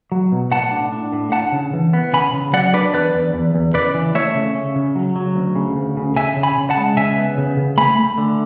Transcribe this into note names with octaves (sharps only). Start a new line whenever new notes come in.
F#3
B2
A2 F#5 A5
D4
D4
A2
D4 F#5 A5
C#3
E3
B3
C#3 G#5 B5
C#3
F#3 D5 F#5
D4 B4 D5
E2 B4 D5
E2
E2
E2
C#3 B4 D5
E3
A3 C#5 E5
C#3
C#4
C#3
F#3
F#3
D2
C#3
D2
C#3
C#3 E5 G#5
C#3
G#5 B5
C#3
F#5 A5
G#3
C#3 E5 G#5
B3
C#3
C#3
A3 G#5 B5
A3
D3